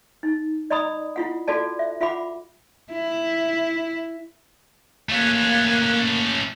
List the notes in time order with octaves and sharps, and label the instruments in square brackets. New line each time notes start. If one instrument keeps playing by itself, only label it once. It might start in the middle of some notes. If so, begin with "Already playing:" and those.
[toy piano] D#4
D5 D#5 A#5 B5 D#6
E4 F4 F#5
F4 F#4 A4 D5 A5
E5
F4 E5 F#5 B5 D6
[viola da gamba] E4
[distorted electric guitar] A3 C#4 [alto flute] A#3 [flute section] F5 F#6 G#6